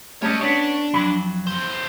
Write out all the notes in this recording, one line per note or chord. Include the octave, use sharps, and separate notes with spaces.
G3 A3 C#4 C#5 D#5
B3 C#4 D4 C#5
F2 F#3 B5
E2 C5